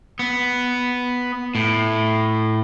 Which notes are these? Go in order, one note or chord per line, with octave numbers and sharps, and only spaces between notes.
B3
A2